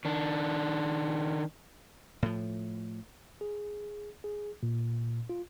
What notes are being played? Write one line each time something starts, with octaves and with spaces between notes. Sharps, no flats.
D#3 D4
A2 F3
G#4
G#4
A#2
F4